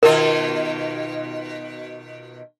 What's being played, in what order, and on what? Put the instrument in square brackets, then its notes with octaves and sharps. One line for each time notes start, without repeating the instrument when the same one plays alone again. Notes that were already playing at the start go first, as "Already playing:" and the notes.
[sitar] B2 D#3 F4 [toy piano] A#4